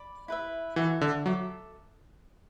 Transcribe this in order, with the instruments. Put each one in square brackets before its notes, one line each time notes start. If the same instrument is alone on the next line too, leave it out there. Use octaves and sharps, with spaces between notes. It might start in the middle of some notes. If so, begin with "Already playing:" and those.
Already playing: [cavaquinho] D5 B5 D6
E4 B4 E5
[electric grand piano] E3 [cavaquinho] F#4 A4 E5
[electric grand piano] D3
[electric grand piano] F#3 [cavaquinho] A4 E5 D6